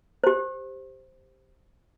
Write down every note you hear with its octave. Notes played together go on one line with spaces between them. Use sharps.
G4 C5